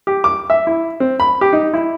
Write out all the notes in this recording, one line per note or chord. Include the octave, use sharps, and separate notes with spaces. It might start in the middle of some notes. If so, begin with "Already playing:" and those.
G4
D6
E5
E4
C4
B5
G4
D#4
E4